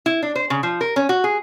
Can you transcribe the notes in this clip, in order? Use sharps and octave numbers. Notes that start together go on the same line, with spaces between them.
E4
D4
C5
C#3
F3
A#4
C#4
F#4
G#4